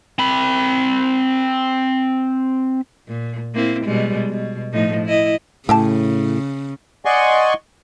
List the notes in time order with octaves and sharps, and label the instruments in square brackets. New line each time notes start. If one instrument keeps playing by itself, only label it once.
[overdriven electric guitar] C4 B5
[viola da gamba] A#2
A#3 C4 E4
B2 G3 G#3
B2
A2 F3 D#4
E4 D#5
[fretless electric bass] A2 [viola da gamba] C#3 [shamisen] E4 G4 A5
[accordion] D5 D#5 F#5 G#5 C6 C#6